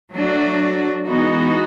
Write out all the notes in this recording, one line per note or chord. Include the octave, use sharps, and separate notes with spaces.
F#3 A3 D4 F#4
E3 G#3 B3 D#4 F#4